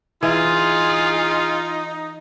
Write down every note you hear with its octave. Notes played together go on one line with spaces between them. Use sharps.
E3 D#4 F4 G#4